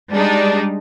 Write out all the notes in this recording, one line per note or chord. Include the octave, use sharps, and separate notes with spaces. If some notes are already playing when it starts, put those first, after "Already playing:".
G3 G#3 D4 D#4